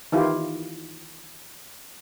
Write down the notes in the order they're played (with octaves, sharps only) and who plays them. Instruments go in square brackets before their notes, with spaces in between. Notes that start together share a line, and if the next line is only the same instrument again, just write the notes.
[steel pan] D#3 E3 E4 F4 G4